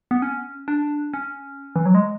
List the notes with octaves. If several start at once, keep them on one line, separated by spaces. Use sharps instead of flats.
B3
C#4
D4
C#4
E3
F#3
G#3